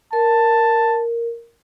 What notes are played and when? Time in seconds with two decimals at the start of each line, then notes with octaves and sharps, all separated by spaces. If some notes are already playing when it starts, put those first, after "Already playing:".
0.13 A#4 A5